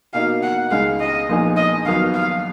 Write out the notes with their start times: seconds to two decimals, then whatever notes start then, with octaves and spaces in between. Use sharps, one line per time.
0.14 B2 A#3 D#4 F#4 F5
0.43 F#5
0.71 C#2 C#3 G#3 D#4 F5
1.00 D#5
1.28 A#2 F3 B3 D#4 G#4
1.57 D#5
1.85 D#2 D#3 F#3 B3 F5
2.14 F5